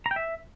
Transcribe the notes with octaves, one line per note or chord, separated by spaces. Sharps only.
A#5
G5
E5